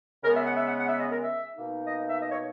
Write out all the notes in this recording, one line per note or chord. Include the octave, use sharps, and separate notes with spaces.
C#3 G#3 B3 A#4
E5
F#5
E5
F#5
F#5
E5
D#5
A#4
E5
B2 A#3 D#4
D#5
E5
D#5
C#5